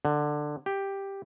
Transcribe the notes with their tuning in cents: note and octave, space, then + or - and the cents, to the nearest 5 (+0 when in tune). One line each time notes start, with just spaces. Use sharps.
D3 +15
G4 +5